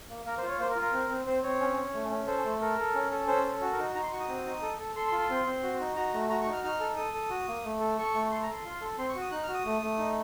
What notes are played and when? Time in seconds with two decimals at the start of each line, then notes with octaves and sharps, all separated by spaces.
0.10 A#3
0.26 A#3 A#4
0.38 C5
0.43 F4
0.48 C#5
0.59 A#3 C5
0.70 A#4
0.76 F4
0.82 A#4
0.93 C4
1.09 C4
1.26 C4 C5
1.43 C4 C#5
1.61 C#4
1.77 C#4
1.94 A3
2.10 C#4
2.27 A4 C5
2.45 A3
2.61 A4 A#4
2.78 A4
2.95 C#4
3.11 A4
3.27 C#4 C5
3.44 A4
3.61 F#4
3.72 A#4
3.79 D#4
3.95 D#4 A#5
4.03 C6
4.12 F#4 C#6
4.20 D#6
4.28 C4
4.46 D#4
4.62 A4
4.78 A4
4.96 A4 C6
5.08 C6
5.12 F4
5.19 C6
5.29 C4
5.46 C4
5.63 F#4
5.80 D#4
5.96 F#4 A#5
6.14 A3
6.29 F#4 A#5
6.41 C#6
6.46 D#4
6.53 F6
6.63 D#4 F6
6.80 A4
6.96 A4 D#6
7.13 A4
7.30 F#4
7.48 A#3
7.65 A3
7.80 A4
7.98 A4 C#6
8.14 A3
8.31 A4 C6
8.43 A#5
8.49 A4 C6
8.65 F4
8.81 A4
8.98 C4 C6
9.09 C#6
9.15 F#4
9.21 D#6
9.31 D#4 F#6
9.43 F6
9.48 F#4
9.54 D#6
9.65 A3
9.82 A3
9.99 D#4